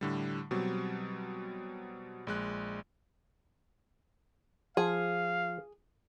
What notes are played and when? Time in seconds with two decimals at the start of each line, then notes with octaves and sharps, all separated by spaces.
0.01 A2 D3 G3
0.51 B2 F#3 G3 C4
2.27 A#1 G#3 F#6
4.77 F3 G#4 F5